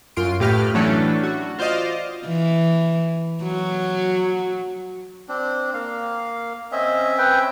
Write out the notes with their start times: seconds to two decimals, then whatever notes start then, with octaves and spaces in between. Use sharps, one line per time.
0.17 F#2 F4 C6 D7
0.40 A2 G4 B4 F6
0.74 E3 F#3 A3 C#4 D4 A4
1.23 F#4
1.58 F4 C5 D5 D#5 F5
2.26 E3
3.43 F#3
5.29 C4 D4
5.74 A#3 F5
6.72 C4 C#4 D#5 E5
7.18 B4 G5